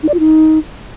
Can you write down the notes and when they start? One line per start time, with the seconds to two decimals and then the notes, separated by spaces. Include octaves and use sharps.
0.03 D#4
0.09 D5
0.14 F4
0.19 D#4